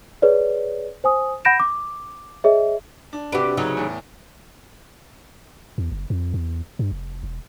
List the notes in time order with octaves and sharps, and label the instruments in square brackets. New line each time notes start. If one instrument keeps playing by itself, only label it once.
[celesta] G#4 B4 C#5 D5
C5 G#5 D#6
F#5 B5 G6 A#6 D7 E7
D6
G#4 C#5 D#5 E5
[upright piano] D4
[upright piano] C3 F#4 B4 [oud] D4 G4
[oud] C#3 F#3 D#4
[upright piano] E2 A2
[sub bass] E2
F#1
F2
E2
G2
F1
E1